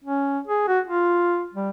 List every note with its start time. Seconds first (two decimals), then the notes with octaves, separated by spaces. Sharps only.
0.04 C#4
0.47 G#4
0.68 F#4
0.87 F4
1.54 G3